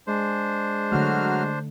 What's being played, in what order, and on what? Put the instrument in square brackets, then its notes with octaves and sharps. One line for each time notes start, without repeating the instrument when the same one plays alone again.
[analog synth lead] G#3 [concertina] D4 C5
[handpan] D3 A3 [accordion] F#3 F#4 F6